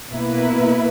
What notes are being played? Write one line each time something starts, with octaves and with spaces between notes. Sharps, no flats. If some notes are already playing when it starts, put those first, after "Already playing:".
B2 A#3 E4 B4